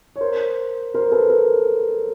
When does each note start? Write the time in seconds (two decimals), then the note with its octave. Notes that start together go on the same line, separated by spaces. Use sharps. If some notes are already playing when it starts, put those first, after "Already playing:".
0.16 C#5
0.21 A#4 C5
0.94 A#4 C5
1.11 A4 B4
1.22 B4
1.30 A#4